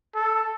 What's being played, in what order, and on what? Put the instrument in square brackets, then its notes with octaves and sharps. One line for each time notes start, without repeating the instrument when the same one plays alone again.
[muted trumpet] A4